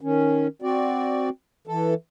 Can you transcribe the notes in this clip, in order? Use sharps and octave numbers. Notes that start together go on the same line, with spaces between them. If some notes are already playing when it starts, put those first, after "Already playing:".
D#3 C#4
C4 F#4 D5
E3 A4